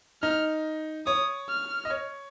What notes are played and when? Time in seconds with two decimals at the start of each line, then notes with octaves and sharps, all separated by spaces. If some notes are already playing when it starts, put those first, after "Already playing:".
0.22 D#4 F6
1.06 C#5 D#6
1.49 F6
1.85 D#5
1.90 C#5